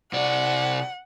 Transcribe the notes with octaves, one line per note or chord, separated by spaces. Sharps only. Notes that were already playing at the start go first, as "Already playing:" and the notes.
C3 D5 F#5